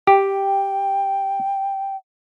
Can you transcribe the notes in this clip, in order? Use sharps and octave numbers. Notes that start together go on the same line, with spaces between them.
G4 G5